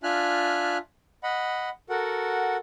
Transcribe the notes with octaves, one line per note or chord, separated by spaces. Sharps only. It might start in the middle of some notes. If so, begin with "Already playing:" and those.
D4 F4 E5 G#5 F6 F#6
D#5 F#5 B5
F#4 A4 A#4 F#5